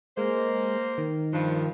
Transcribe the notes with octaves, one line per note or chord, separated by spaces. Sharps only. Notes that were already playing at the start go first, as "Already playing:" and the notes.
G#3 A#3 C5
D#3
G2 F3